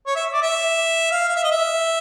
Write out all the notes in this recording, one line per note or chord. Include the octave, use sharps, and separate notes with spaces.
C#5
E5
D5
E5
F5
F5
E5
D#5
E5